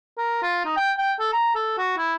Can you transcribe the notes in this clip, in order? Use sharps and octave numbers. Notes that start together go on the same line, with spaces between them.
A#4
F4
D#4
G5
G5
A4
A#5
A4
F#4
E4